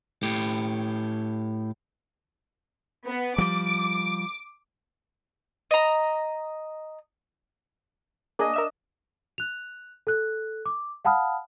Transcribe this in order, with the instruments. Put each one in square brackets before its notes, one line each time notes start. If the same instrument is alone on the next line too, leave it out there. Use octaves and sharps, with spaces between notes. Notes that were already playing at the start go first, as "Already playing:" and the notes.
[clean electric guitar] A2 G4
[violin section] B3
[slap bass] F3 G3 [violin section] D6
[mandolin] D#5 A#5
[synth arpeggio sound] A#3 G#4 [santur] D4 D#5
[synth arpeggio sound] A#4 E5 E7
[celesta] F#6 F7
A4 F#6
D6
F5 F#5 A5 B5 D#6 F6